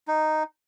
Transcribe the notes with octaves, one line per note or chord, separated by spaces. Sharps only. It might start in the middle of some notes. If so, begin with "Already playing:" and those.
D#4